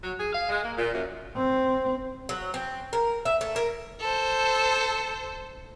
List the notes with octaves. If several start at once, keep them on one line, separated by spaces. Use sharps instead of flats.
F#3
G#4
F5
G#3
A#3
A#2
F#2
C4
F#3
C4
A#4
E5
A3
A#4
A4 C5